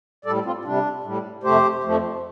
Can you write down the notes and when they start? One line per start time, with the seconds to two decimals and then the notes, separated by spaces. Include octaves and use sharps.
0.25 A2 G3 A4 D5
0.45 C4 F4
0.65 C3 G3 D4
1.04 A2 G3
1.43 F2 C3 A3 G4 C5
1.83 F2 F3 A3